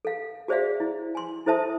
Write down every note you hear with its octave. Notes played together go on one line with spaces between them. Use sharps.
A4 F5
F#4 G#4 C5 D5 E5 F5
E4
G#5 C6
E4 A4 C5 E5 A5 D#6